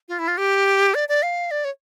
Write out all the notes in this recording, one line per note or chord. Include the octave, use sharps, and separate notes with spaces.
F4
E4
F4
G4
D5
D5
F5
D5
C#5